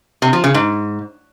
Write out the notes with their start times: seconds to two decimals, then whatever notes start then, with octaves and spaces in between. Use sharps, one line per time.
0.22 C3
0.33 F3
0.44 C#3
0.54 G#2